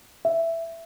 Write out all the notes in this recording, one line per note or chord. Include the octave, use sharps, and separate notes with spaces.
E5